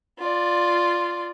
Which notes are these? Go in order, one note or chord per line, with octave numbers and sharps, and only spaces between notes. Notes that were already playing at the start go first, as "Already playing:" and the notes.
F4 D5